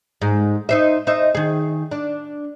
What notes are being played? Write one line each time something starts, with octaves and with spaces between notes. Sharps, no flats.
G#2
D#4 C5 E5
D#4 C5 E5
D#3 G#4
D4